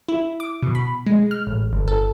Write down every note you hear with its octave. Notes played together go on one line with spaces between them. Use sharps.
E4
D6
B2
B5
G#3
F6
A1
G1
A4